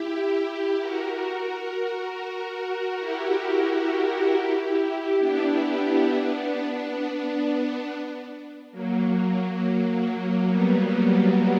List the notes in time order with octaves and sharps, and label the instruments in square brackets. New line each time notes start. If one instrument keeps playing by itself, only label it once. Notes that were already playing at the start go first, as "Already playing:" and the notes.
Already playing: [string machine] E4 G4
F#4 A#4
F#4 A#4
E4 G4
B3 D4
F#3 A#3
G3 B3